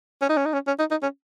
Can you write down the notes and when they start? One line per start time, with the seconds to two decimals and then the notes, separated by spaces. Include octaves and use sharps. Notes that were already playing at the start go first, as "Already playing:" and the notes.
0.22 C#4
0.29 D#4
0.37 C#4
0.45 D#4
0.53 C#4
0.67 C#4
0.79 D#4
0.91 D#4
1.03 C#4